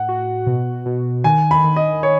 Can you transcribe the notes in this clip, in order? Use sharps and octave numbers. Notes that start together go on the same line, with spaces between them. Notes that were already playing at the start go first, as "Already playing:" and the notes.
Already playing: A2 F#5
F#4
B2
B2
D#3 G#5
B5
D#3
D#5
D#3 C#5